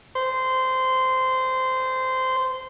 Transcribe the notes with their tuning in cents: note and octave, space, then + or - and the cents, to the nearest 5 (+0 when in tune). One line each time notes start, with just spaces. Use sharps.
C5 -15